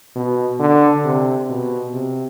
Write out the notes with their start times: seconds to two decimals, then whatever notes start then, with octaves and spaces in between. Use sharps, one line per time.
0.15 B2
0.60 D3
1.05 C3
1.49 B2
1.94 C3